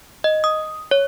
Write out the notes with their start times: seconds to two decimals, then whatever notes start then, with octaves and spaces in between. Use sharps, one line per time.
0.24 D#5
0.44 D#6
0.91 C#5